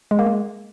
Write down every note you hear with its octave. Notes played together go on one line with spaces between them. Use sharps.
G#3
A#3
G#3